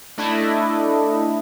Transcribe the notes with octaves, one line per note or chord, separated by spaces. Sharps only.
A3 D4 E4 D#5